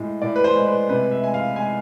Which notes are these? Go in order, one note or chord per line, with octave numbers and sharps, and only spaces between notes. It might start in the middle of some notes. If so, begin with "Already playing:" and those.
Already playing: A2 G#3
A2 D5
B4
C5
G#3
B4
C3 B4
E5
G#3 G#5
F5
G#3 G#5